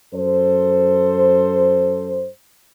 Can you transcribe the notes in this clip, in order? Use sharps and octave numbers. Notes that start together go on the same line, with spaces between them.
F#2 A4 C5